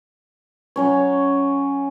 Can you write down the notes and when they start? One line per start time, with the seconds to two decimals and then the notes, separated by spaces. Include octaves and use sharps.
0.76 F#3 C#4 C#5